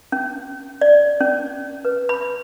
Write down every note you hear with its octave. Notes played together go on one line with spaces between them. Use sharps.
C#4
D5
C#4
B4
B5